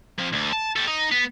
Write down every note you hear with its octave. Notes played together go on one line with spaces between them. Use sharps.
F3 C4
D2 D3
A5
G3 A4
D#4
B3